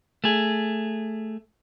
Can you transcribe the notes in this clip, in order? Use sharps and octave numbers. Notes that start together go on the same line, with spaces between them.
A3 G#4